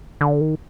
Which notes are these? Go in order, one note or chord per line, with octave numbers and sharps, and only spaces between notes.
D3
D#3